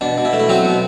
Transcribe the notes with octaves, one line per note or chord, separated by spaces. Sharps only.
B2 D4
B2
E4
A3
E4
F#3 C4 F#4
B2